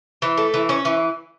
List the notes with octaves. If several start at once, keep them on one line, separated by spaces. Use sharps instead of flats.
E3
A3
E3
C#4
E3